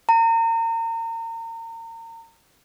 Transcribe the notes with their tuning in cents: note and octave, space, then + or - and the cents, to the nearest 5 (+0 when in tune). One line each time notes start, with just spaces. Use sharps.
A#5 -35